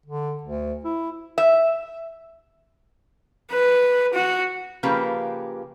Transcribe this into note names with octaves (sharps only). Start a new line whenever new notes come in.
D3
D2
E4
E5
B4
F#4
C#3 F3 A#3 G4 B4